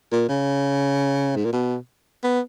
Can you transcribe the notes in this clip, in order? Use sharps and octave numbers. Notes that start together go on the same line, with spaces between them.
A#2
C#3
G#2
A#2
B2
B3